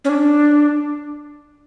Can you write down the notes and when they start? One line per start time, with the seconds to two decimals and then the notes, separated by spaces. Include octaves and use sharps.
0.05 C#4
0.09 D4